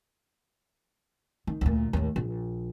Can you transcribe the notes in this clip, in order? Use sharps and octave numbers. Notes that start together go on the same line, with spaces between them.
D#3
D2 A#2
D#2 A2
A#1